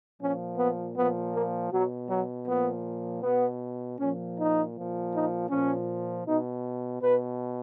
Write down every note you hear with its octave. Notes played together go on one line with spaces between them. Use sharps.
A#2 F3 C#4
B3
A#2 F3 B3
A#3
B2 F#3
F#3
A#2 F3 B3
B2 B3
A#2 F3 C#4
D#4
A#2 F3
D#4
A#2 F3 C#4
B2 D#4
B2 B4